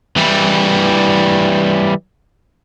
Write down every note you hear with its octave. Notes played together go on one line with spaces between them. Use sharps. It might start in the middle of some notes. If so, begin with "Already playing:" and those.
E3 G3